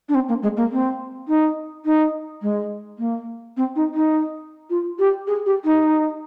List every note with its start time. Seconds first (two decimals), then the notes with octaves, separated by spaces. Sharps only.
0.09 D4
0.15 C4
0.29 A#3
0.43 G#3
0.57 A#3
0.72 C4
1.28 D#4
1.85 D#4
2.42 G#3
2.99 A#3
3.57 C4
3.76 D#4
3.94 D#4
4.70 F4
4.99 G4
5.27 G#4
5.46 G4
5.65 D#4